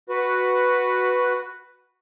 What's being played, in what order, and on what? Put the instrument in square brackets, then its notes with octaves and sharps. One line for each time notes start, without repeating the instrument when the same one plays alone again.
[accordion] F#4 B4